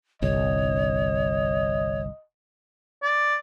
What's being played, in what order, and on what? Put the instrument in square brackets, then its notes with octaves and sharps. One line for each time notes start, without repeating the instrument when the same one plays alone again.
[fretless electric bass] G1 C2 [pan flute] C#5 [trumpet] D#5
[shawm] D5